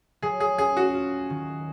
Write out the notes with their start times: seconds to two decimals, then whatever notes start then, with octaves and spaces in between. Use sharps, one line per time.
0.22 F#3 G#4
0.40 G#4
0.58 C#4 G#4
0.77 F#4
0.94 F4
1.30 D#3